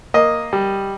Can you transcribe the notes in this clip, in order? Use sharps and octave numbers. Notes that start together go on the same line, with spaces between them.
A#3 D#5
G3